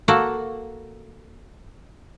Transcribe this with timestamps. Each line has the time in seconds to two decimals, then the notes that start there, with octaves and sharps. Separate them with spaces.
0.08 A#3 F#4 A4